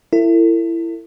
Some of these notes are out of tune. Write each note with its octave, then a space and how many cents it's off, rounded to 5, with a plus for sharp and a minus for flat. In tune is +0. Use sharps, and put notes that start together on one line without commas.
E4 +20 A4 +45